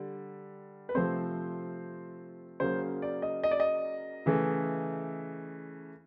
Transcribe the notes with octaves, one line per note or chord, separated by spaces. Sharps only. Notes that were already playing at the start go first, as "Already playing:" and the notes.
Already playing: D3 G3
B4
C3 F3 A3 C4 C5
C#3 F#3 A#3 C5
D5
D#5
D#5
D5
D#5
C#3 E3 A3